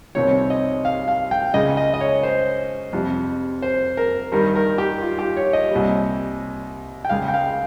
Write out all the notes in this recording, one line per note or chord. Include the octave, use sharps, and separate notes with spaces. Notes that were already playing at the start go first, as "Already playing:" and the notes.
C2 C3 D#3 G3 C#5
D#5
F5
F5
G5
C#2 C#3 G#3 D#5
D#5
D#5
C#5
C5
F2 C3 G3
C5
A#4
G2 D#3 G3 A#4
A#4
G4
F4
G4
C#5
D#5
C2 A#2 G3
G5
C#2 C#3 G#3 F5
G5
F5